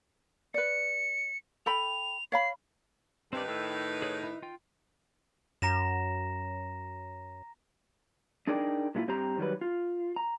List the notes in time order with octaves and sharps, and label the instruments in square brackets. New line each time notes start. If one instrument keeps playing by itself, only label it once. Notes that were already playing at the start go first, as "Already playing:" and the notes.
[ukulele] B4 D5 [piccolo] C#7
[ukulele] A4 G5 B5 [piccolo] F7
[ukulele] C#5 F5 B5 [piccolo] C7
[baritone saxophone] G2 [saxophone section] D#3 D#4 B4 [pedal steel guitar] C4 D5
[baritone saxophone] A2 [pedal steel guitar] G5 E6
[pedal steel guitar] G#4 C#5
E4
F4 G5
[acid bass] F#2 [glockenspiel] A#5 A#6 E7
[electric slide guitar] D4 D#4 G#4 A#4 D5 G5
A#2 G#3 A3 E4 F4
G2 C4 G4 C5 A#5
D#3 F#3 G3 B4
F4
A#5